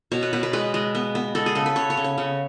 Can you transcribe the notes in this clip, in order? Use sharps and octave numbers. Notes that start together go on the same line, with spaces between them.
B2 C#5
B4
B2 B4
B4
G#3 B4
G#3
B3
B3
G#3 A4
G#4
C#3 A4
B4
C#3 C#5
C#5
C#3
C#5
C#3